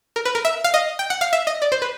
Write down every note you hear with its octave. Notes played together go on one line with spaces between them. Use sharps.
A#4
B4
A#4
E5
F5
D#5
G5
F#5
F5
E5
D#5
D5
C5
B4